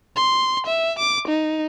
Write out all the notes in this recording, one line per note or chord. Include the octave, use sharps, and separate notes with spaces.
C6
E5
D6
D#4